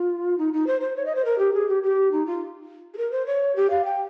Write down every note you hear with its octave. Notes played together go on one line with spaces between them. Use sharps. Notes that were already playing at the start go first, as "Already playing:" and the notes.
Already playing: F4
D#4
D#4
C5
C5
C#5
D#5
C5
A#4
G4
G#4
G4
G4
D#4
F4
G#4
A#4
C5
C#5
G4
F5
G5